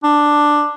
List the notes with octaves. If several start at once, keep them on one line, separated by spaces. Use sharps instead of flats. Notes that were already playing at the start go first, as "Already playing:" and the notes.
D4